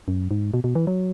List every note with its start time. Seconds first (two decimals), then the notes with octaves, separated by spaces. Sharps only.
0.08 F#2
0.31 G#2
0.54 B2
0.64 B2
0.75 E3
0.87 F#3